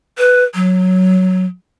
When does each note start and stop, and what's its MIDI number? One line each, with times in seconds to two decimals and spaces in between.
0.18 0.44 71
0.55 1.46 54